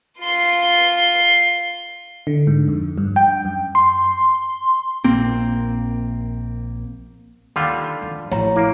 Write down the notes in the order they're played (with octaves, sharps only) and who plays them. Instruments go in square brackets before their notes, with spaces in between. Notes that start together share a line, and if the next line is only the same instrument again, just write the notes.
[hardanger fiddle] F4 C6
[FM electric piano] D3
G#2
F2
G2
G5
F#2
C6
[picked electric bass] A#1 A#3 C4
[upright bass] D#2 [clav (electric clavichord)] D3 G3 F4
[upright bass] F2
[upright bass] A1 F3 [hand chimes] C#5 A#5
[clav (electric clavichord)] A#3 [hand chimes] E4 D7